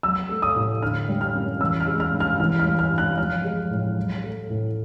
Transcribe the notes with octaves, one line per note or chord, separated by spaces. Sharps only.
F#3 E6
A3
D#6
A2
D3 F6
G3
F6
F#2
E3 E6
F6
G#3
F6
G2
F6
E3 F6
F6
G3
F6
G2
F#6
F3 F6
G#3
A2
F#3
A3
A2